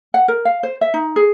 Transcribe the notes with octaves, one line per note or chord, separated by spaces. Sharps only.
F#5
A#4
F5
C5
E5
D#4
G#4